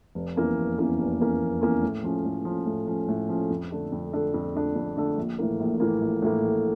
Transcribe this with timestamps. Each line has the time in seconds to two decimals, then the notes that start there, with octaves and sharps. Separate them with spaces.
0.15 F1
0.36 E2 E3 A#3 C#4
0.57 F1
0.78 E2 E3 A#3 C#4
0.98 F1
1.20 E2 E3 A#3 C#4
1.41 F1
1.61 E2 E3 A#3 C#4
1.83 A2
2.04 F3 C#4
2.25 A2
2.45 F3 C#4
2.66 A2
2.88 F3 C#4
3.08 A2
3.29 F3 C#4
3.50 F2
3.71 D3 A3 D4 A4
3.92 F2
4.13 D3 A3 D4 A4
4.34 F2
4.55 D3 A3 D4 A4
4.76 F2
4.97 D3 A3 D4 A4
5.17 A#1
5.39 A2 E3 A#3
5.60 A#1
5.80 A2 E3 A#3
6.01 A#1
6.22 A2 E3 A#3
6.43 A#1